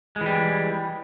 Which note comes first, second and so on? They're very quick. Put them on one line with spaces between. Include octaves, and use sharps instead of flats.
G#3 E3 G3